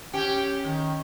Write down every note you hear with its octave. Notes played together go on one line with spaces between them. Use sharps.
C#4 G4
D#3